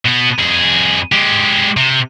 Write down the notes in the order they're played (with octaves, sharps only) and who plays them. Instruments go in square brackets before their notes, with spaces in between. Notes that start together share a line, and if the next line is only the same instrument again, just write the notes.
[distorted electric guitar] B2 B3
F2 G#4
G#3 G4
C3